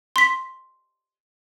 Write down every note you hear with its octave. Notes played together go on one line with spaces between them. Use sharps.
C6 B6